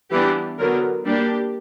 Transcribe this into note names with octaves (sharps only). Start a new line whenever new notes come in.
E3 G3 B3 D4 G4
D3 F#3 B3 A#4
G3 A#3 D4 G4